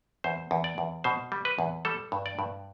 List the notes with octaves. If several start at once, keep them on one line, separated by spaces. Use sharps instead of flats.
E2 C5
E2
D5
E2
B2 C5
G3
B4
E2
G3 A4
G2
D5
G2